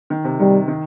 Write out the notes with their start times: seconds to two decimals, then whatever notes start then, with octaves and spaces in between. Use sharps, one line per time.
0.10 D#3
0.24 C3
0.39 D#3 G3
0.68 D#3